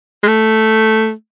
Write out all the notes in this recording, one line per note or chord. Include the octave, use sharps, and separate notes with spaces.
G#3
A3